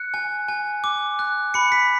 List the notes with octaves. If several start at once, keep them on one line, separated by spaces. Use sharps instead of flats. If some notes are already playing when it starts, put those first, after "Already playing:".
Already playing: F#6 C#7
G#5
G#5
D6
F#6
B5 C#7
B6